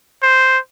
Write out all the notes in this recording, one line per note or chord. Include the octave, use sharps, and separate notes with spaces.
C5